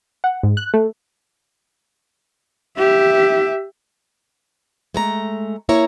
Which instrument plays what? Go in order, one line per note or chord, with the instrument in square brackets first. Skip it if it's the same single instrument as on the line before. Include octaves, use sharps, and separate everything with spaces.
[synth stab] F#5
G#2
F#6
A3
[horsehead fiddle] G4 E5
[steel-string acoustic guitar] G#3 A3 A#5
A#3 E4 C#5 A#5